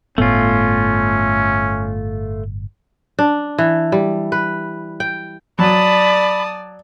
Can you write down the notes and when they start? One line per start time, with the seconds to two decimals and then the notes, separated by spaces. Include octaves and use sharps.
0.18 G1 A2 A3 B3 C#4 F4
3.19 D4
3.58 E3
3.92 G3
4.32 B4
5.00 G5
5.59 F#3 D5 A5 B5 D#6